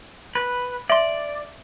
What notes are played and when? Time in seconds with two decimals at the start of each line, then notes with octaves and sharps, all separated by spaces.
0.35 B4
0.90 D5 E5 C6